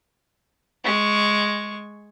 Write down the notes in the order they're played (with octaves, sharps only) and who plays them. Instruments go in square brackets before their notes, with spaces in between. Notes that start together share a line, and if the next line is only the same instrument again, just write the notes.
[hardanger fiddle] G#3 C#6